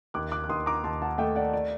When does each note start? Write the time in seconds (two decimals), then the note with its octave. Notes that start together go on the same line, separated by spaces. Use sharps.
0.14 D#2 D6 F#6
0.32 D6 F#6
0.44 F#6
0.49 D#2 C6 D#6
0.66 A#5 D6
0.84 D#2 A5 C6
1.02 F#5 A5
1.18 A3 D#5 G5
1.35 D5 F#5
1.53 D5